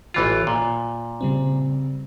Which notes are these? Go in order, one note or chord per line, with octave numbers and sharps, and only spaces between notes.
A1 E3 F4
A#2
C#3 G3 C4